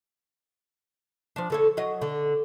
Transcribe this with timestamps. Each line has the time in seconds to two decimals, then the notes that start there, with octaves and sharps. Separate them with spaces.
1.36 F3 D4
1.50 D3 A4 C#5
1.77 F#3 D#5
2.02 D3